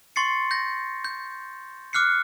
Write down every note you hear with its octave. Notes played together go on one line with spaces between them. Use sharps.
C6 C#6 A6 C7 C#7
G6 A#6
G6
D6 F6 F#6 C7 C#7